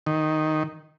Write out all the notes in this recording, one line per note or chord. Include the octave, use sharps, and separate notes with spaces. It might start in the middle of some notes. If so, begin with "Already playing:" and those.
D#3